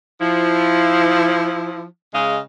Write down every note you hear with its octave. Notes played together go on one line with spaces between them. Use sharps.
F3 E4
C#3 G#3 D#5 F5